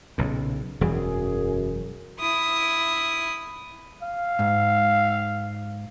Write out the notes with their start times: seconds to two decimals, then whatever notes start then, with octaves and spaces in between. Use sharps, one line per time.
0.18 B1 A#2 C#3
0.81 E1 F#2 E3 G3 G#4
2.20 E4 D#6
4.02 F5
4.39 G#2